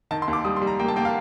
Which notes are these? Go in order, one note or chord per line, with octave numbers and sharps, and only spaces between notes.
D#3 A5
C6
D#2
D6
G3 D#6
C6
G3
A#5
A#3 G5
A5
A#3 G5
F5